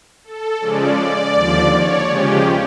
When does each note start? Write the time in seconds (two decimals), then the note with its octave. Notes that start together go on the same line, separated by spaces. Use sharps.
0.24 A4
0.60 C#3 F3 G#3 C#4 D5
0.97 D5
1.34 D#2 D3 F3
1.70 C#5
2.08 C#3 F3 G#3 C#4 G4